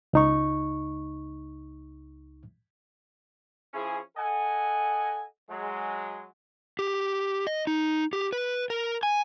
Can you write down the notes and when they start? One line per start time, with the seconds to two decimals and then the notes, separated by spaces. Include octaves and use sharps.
0.13 C#2 D#4 C#6
3.74 F3 C#4 E4 G#4
4.17 A4 D#5 F#5 G#5
5.50 F#3 G#3
6.79 G4
7.47 D#5
7.67 D#4
8.13 G4
8.33 B4
8.70 A#4
9.03 G#5